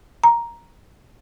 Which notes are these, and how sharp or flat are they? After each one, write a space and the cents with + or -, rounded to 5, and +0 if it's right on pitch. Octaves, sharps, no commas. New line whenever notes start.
A#5 +5